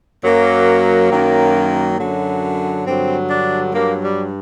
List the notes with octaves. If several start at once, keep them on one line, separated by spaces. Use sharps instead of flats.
F#2 F#3 A#3
F#2 D#3 F#3
F#2 D3 F#3
G2 D3 F#3 C4
D4
G2 F#3 A#3
G3